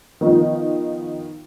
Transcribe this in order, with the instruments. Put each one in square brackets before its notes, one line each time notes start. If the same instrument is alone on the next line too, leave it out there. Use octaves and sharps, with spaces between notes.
[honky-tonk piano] D#3 F3 B3 D#4 F4